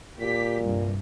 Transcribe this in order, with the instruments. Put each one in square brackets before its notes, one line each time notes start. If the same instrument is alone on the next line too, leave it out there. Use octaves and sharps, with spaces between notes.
[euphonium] A#2 [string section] G4 B6
[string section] C2 G2